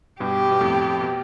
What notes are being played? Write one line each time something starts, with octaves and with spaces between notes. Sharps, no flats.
G2 B2 G4
B2
F2 A2
B2